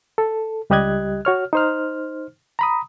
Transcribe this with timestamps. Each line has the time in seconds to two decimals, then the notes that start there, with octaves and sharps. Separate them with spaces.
0.18 A4
0.70 C#2 G3 G4 D#5 F#6 G#6
1.25 F#4 C#5 F6
1.53 D#4 C5 F6
2.59 A#5 B5 D#6